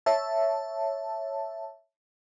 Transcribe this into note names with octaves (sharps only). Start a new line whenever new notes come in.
C#5 E5 A5